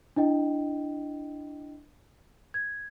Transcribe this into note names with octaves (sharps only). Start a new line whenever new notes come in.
D4 E4 D#5 G5
G#6